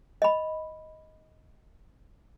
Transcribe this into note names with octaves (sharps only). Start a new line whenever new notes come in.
D#5 B5